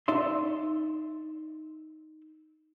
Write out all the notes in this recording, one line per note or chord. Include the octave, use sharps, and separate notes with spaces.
D#4 D5 E5 C6